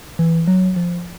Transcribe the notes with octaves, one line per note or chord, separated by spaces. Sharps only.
E3
F#3
F3